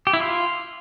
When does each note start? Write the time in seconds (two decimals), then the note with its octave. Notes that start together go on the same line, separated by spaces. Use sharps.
0.07 G4
0.13 E4
0.20 F4